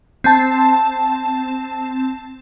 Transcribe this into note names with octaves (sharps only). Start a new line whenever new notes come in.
C4 A5